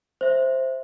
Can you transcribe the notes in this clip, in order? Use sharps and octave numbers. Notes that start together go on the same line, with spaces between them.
C5 E5